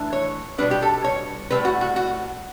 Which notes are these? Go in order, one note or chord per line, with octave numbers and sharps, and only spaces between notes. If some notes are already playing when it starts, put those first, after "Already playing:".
Already playing: E3 A3 D4
C#5
B2 G3 D4 B4
G4
A4
C#5
A2 E3 G3 B4
F#4
F#4
F#4